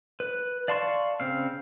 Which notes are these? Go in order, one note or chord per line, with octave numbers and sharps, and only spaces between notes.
B4
D5 F5 A5 C6 C#6
C#3 C4 F5